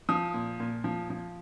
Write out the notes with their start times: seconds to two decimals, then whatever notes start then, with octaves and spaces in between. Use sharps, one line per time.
0.09 F3 D#6
0.34 A#2
0.60 A#2
0.84 F3
1.10 F3